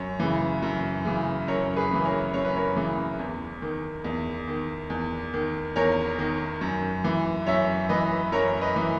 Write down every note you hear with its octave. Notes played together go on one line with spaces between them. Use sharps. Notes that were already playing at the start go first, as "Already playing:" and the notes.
Already playing: F#2 C#5
C#3 E3
F#2
C#3 E3
F#2 A#4 C#5
G#4 B4
C#3 E3
A#4 C#5
F#2 C#5
B4
A#4 C#5
C#3 E3
E2
D#3
E2
D#3
E2
D#3
E2 A#4 C#5
D#3
F#2
E3
F#2 C#5 E5
E3 B4 D#5
F#2 A#4 C#5
B4 D#5
E3